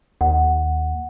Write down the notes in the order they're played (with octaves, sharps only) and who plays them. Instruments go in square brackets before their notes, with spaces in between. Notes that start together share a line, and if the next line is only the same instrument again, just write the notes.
[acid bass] D#2 [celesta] F#5